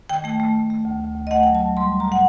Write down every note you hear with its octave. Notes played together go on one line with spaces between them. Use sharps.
D#3 G5
A3 G5
A3
A3
A3
D2
D2
D2
D#5
A3 F#5
F#3 G5
A5
F#3
G3 C6
G3
A#5
A#2 F#5